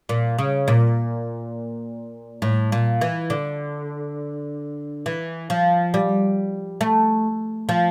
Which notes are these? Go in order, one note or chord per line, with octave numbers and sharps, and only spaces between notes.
A#2
C#3
A#2
A2
A#2
E3
D3
E3
F3
G3
A3
F3